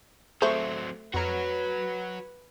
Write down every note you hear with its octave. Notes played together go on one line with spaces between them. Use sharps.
F#3 A3 C4 G#4 C5 C#6
F2 F#4 B4 C#5 A#5 F6